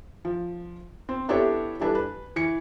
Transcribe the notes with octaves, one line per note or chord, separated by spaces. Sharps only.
F3
C4
B3 D4 E4 G4 A4 C#5
E3 G3 D4 A4 B4
B4
E3 C#7